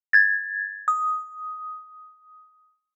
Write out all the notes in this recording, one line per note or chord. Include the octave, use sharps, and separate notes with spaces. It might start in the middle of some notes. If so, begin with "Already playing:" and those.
G#6 A6
D#6